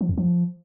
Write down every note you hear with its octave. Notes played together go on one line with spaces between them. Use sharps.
F3
F2
F3